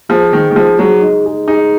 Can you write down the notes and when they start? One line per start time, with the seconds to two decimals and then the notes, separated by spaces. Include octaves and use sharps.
0.09 F3 G#4
0.32 D#3 D#4
0.51 D#3
0.55 F3 G#3
0.79 F#3 G#3
1.02 D#4
1.25 G#4
1.48 D#4 G#4